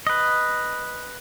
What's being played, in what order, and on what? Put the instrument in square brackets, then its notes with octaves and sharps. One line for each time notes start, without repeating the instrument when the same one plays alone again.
[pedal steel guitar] B4 D#5